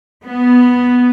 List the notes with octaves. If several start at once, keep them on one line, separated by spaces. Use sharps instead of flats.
B3